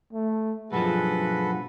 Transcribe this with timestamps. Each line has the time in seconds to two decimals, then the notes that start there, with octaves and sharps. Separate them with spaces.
0.13 A3
0.72 B1 G2 F3 F#4 G#4 A4 B4